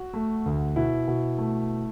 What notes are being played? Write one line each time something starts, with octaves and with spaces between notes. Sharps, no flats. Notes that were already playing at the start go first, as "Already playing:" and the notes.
Already playing: F#4
A3
D2
B2 E4
B2
A3